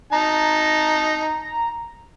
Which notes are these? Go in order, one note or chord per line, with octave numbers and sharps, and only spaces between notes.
D#4 A5 A#5